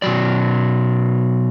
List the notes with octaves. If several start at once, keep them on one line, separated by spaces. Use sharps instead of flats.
B2 F#3 D5